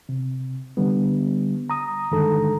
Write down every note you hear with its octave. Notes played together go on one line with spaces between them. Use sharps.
C3
D3 G3 B3
A#5 D#6
G2 D3 D#3 G#3 A4 A#5